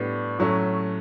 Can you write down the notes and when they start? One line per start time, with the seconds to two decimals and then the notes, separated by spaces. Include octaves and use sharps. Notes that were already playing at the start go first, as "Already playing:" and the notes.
Already playing: A2 G3 B3 D4
0.39 A2 F#3 A3 C#4